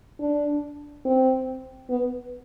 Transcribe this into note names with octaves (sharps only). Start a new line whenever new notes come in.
D4
C4
B3